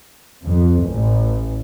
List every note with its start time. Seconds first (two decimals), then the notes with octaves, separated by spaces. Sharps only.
0.45 F2
0.88 A1